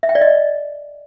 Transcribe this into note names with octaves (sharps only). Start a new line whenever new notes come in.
E5
G5
D5
D#5